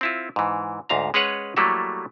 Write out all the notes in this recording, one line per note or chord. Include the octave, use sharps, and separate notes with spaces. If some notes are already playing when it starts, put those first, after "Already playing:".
C4 E4 F4
G#2 E3
D2 G#2 F5 A#5
G#3 C#4 G#4 B4 C#5 F#5
F#3 G3 A3 A#3 E4 A4